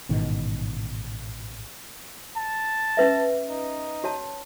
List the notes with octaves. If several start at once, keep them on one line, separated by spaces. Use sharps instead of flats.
A1 G#2 B2 D#3
A5
C#4 B4 E5
D#4
F#4 C#5 A5